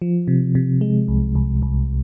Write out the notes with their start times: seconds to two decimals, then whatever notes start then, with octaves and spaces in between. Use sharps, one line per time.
0.02 F3
0.28 C3
0.55 C3
0.81 G#3
1.08 C2
1.35 C2
1.62 C2